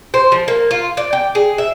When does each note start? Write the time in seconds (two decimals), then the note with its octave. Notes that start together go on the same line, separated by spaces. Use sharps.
0.14 C5
0.32 F3
0.48 A#3
0.71 F4
0.97 D5
1.13 G5
1.35 G#4
1.58 E5